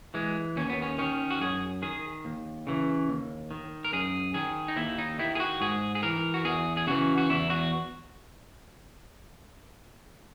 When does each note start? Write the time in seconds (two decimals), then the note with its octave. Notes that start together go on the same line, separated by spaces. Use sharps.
0.14 E3 G#3
0.56 D#2 C#4
0.70 B3
0.82 C#4
0.98 D#3 C#4
1.30 F#4
1.41 F#2 G#4
1.82 D#3 G#4
2.25 D#2
2.67 C#3 E3
3.09 D#2
3.51 D#3
3.85 A#4
3.93 F#2 G#4
4.34 D#3 G#4
4.68 D#4
4.76 D#2 E4
4.98 D#4
5.19 D#3 E4
5.35 G#4
5.40 F#4
5.61 G#2 G#4
5.95 G#4
6.03 E3 A#4
6.34 F#4
6.44 E2 G#4
6.77 G#4
6.87 C#3 E3 F#4
7.18 F#4
7.30 E2 E4
7.50 F#4